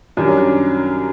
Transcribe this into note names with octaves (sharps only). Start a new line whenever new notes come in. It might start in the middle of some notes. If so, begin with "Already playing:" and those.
F#2 D#3 G3 D4
C#4
D4